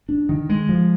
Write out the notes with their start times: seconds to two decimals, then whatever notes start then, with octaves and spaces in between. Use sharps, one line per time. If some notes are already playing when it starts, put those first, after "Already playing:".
0.09 D4
0.29 D#3
0.49 G#3
0.69 F3